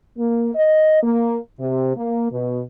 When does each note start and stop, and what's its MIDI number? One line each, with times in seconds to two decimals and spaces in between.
0.17 0.51 58
0.55 1.00 75
1.03 1.37 58
1.60 1.95 48
1.96 2.27 58
2.31 2.61 47